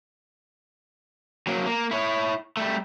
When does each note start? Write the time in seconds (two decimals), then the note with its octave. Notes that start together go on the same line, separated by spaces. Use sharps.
1.47 F#3 A#3
1.66 A#3
1.91 E4 C#5
2.57 G3 A3